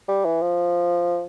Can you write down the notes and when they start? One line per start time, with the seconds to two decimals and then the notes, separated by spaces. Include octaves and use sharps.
0.09 G3
0.25 E3
0.42 F3